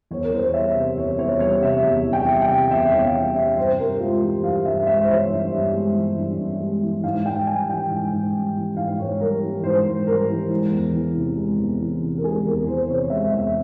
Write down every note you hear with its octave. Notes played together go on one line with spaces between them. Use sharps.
E2 C#5
A#4
E2 C5
C#5
G3 E5
C3
E2 C#5
E2 C#5
G3 C#5
C3 E5
E2
E2
G5
G3
G5
C3
E2 E5
E2 C#5
F5
G3 E5
C3 E5
G2 C5
G2 A#4
G#3 F4
E3 G4
G2 F5
G2 E5
G#3 E5
C5
E3 C#5
G2
G2
G#3
E3
G2
G2
G#3
E3
G#2 F5
G#2 G5
G3 G#5
E3 G5
G#2
G#2
G3
E3
G#2 F5
G#2 C#5
G3 A#4
E3
G#2 C5
G#2
G3 A#4
E3
G#3
E2
E3
C3
G#3
E2
E3
C3
A#4
G#3 G#4
E2 A#4
E3 C5
C5
C3 C#5
G#3 E5
E2 E5